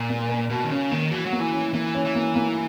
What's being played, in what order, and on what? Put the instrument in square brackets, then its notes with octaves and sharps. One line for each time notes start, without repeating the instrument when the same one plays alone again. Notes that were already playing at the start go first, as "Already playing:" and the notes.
Already playing: [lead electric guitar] A#2 [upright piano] A#4
[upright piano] A#3
A#4
[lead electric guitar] B2 [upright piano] F#4
[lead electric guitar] D#3
[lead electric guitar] C#3 [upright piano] C#4
[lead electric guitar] D#3 [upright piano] A#3
[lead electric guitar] E3 [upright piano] F#4
[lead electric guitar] F#3
[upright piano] A#3
[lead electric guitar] E3
[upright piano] C#4
[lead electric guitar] E3 [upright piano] A#3
[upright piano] C#4
[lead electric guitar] E3
[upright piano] A#3
A#3